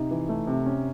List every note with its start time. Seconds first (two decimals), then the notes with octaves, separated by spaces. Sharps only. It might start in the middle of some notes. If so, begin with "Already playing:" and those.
Already playing: C3 D#4
0.11 E3
0.29 A3
0.47 C3
0.66 C#4